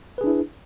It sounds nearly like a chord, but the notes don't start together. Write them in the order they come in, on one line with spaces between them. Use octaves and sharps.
B4 G#4 D4 E4